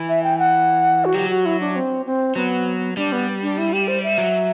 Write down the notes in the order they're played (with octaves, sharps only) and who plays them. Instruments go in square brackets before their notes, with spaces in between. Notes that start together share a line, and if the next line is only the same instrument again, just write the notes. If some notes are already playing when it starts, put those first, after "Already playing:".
Already playing: [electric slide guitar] E3
[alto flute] E5
G5
F#5
F#4
[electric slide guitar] F#3 [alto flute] G4
[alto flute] F#4
E4
D4
C4
C4
[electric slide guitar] F#3 [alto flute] B3
[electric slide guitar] G3 [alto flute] D4
[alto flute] B3
D4
E4
G4
C5
E5
[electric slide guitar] F#3